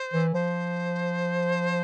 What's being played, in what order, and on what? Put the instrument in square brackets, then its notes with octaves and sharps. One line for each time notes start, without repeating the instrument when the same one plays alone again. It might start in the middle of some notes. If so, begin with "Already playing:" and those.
Already playing: [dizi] C5
[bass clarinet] E3
[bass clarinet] F3 [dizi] C5